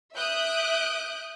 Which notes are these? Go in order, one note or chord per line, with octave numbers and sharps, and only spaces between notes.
E5 D#6 F#6 G6 D7